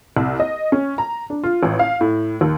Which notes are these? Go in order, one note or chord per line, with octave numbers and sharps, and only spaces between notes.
C2
D#5
C#4
A#5
D4
F4
A1
F5
A2
D#2